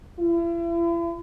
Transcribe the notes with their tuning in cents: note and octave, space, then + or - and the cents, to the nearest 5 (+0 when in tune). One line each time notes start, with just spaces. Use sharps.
E4 +40